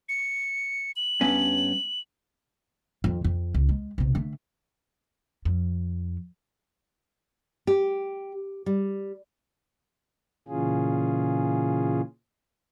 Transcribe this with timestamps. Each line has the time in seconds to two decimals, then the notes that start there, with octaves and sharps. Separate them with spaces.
0.09 C#7
0.96 F#7
1.21 G2 B3 C#4
3.04 F2 D#3
3.24 F2
3.54 C#2
3.69 G#3
3.98 B1 C3
4.15 D3 A3
5.45 F2
7.67 G4
8.66 G3
10.48 A#2 C#3 E3 C#4 F4 G#4